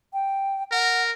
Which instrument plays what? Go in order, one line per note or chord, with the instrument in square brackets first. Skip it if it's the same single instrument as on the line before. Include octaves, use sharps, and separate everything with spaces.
[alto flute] G5
[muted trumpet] A#4 [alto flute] F#5